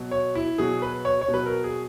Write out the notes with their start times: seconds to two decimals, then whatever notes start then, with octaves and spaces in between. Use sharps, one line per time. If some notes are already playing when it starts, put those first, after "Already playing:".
Already playing: B2 F#3
0.11 C#5
0.35 E4
0.58 B2 F#3 G#4
0.82 B4
1.05 C#5
1.21 C#5
1.28 B2
1.34 F#3 B4
1.46 A#4
1.64 G#4